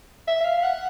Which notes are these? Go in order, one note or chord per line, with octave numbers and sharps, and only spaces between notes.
E5
E5
F5
F#5